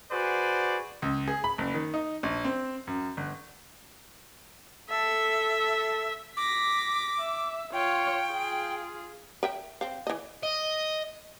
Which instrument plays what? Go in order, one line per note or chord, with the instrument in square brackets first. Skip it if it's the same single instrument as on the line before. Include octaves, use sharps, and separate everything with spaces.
[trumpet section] F#4 G#4 B4 C5 D5
[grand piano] C#2
G#4
B5
F#1
D#3
D#4
A#1
C4
F#2
G1
[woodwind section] A4 [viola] E5
[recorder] D6 [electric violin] A#6 B6
[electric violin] E5
[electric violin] F4 C#5 [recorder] G5
[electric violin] F4 G#4
[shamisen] A#4 E5 G5
C4 F5
E3 D#5
[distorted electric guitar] D#5